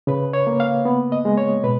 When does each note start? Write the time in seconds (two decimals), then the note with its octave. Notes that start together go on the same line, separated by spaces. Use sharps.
0.07 C#3 B4
0.33 C#5
0.47 A#3
0.60 F5
0.85 B3
1.12 D#5
1.25 G#3
1.38 C#5
1.64 B2 B4